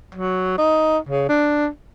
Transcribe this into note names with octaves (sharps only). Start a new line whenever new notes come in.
F#3
D#4
C#3
D4